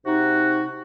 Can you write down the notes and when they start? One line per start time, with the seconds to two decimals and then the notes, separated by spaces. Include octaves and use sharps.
0.06 C3 D#4 F#4